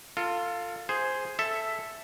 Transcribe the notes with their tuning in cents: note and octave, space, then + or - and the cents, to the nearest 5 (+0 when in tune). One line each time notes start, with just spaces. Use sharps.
F4 +0 A4 +30
G#4 +0 C5 +0
A4 +0 E5 +0